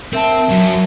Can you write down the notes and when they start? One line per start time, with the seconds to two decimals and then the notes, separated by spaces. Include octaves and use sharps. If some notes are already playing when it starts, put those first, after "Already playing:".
0.13 C4 A#4 E5 A5
0.49 F#2 F#3